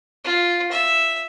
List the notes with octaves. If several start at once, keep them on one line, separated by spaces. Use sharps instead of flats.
F4
E5